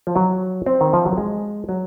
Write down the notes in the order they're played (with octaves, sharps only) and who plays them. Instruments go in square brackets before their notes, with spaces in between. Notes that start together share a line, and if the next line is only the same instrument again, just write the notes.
[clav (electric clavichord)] F3
F#3
C4
D#3
F3
F#3
G#3
F#3